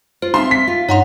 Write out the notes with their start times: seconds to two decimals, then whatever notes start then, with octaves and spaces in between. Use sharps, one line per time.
0.22 F4 C5
0.34 C4 D#4 E5 F5 C6
0.51 B6
0.67 F4 F5
0.89 G2 D#4 C#5 F#5 C6